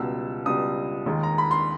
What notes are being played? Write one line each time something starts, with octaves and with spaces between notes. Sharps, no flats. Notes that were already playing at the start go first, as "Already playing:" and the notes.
Already playing: C#2 B2 G3 E6
C#2 B2 G3 D#6
D#2 D#3 G#3
A#5
B5
C6